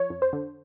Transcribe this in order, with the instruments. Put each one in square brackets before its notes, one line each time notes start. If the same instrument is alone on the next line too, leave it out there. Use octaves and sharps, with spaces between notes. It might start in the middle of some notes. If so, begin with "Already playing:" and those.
Already playing: [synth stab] F3 C#5
F2
C5
D3